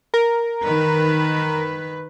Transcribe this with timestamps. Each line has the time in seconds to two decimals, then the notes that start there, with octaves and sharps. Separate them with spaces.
0.14 A#4
0.64 D#3 B4